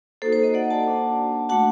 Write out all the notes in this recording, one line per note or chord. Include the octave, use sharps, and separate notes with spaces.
A#3 D#4 F#4 A4 C5
A4 C5
C5 D#5
D5 F#5
F#5 A5
A#3 D4 F#4
A3 D4 F#4 F#5 A5